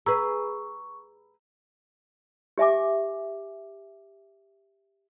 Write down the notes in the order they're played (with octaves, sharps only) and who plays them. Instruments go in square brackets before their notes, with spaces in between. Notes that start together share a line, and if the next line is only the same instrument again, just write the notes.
[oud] G#4 B4 [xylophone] A#5 E6 [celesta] C#6
[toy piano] G4 E5 G#5 D6